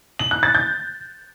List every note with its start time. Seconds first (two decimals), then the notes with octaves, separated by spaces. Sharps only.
0.19 F#7
0.31 F#6
0.43 A6
0.55 G6